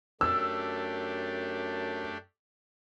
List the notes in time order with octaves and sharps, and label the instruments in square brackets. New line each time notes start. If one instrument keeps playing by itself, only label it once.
[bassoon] F#2 [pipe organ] A3 D4 G4 [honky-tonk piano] E6